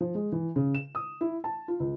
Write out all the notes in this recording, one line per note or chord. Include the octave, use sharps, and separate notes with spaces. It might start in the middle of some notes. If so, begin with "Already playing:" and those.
F3
G#3
E3
C#3
E7
D#6
E4
A5
F4
C#2